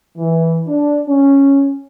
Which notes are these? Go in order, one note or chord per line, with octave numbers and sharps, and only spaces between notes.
E3
D4
C#4